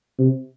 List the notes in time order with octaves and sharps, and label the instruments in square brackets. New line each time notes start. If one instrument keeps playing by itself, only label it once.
[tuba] C3